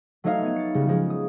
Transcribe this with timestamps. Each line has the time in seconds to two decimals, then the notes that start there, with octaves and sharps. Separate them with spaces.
0.24 F#3 A3 D#4 C#5 D#5 F5
0.42 B3 G#6 D#7
0.56 A6 C#7
0.75 C#3 G3 G#3 B3 C#4
0.87 F3 G#3 C#4
1.10 D#6